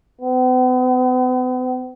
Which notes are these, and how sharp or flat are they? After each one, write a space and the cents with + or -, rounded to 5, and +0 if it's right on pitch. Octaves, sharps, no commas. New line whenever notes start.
B3 +45